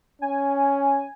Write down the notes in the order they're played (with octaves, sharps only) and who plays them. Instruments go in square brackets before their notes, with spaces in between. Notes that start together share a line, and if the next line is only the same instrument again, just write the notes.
[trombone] C#4 [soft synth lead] G#5